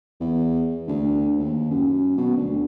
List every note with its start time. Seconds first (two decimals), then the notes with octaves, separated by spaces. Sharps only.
0.21 E2
0.88 D2
1.38 D#2
1.70 F#2
2.17 B2
2.36 D2